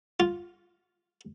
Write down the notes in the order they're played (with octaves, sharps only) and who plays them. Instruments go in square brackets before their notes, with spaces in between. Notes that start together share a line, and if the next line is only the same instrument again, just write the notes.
[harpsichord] F4